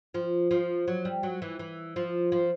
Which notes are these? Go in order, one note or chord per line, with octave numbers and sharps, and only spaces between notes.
F3
F3
F#3
G3
F#3
E3
E3
F3
F3